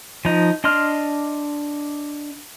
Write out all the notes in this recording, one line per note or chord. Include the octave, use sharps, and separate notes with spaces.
F3 D#4
D4 D#5 C6 F6